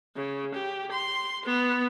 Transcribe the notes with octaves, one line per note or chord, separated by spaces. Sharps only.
C#3
G4
C6
B3